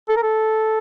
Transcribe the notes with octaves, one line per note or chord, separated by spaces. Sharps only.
A4
A#4
A4